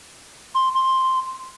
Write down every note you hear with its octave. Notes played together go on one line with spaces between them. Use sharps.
C6
C6